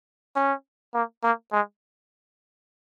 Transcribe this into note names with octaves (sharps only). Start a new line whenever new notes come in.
C#4
A#3
A#3
G#3